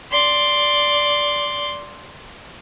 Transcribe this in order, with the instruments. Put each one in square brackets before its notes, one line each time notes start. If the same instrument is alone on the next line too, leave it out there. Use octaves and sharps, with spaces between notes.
[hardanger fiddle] D5 C6